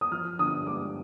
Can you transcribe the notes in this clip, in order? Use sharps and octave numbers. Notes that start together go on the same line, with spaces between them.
D#6
F3 F6
D3 D#6
G#3 D6